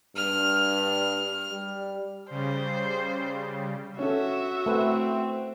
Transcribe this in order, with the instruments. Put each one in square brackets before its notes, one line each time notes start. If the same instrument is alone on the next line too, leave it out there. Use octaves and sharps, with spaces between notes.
[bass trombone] G2 [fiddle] F6
[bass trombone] G3
[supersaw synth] C#3 G3 [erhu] C5
[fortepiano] C#4 A4 [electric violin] F#4 E5
[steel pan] A3 B4 [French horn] C4